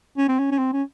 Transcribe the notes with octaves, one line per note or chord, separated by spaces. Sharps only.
C#4
C4
C#4
C#4
C4
C#4